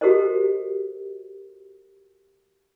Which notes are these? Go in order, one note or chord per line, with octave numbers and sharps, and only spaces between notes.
F#4 G4 A4 A#4 C5 D#5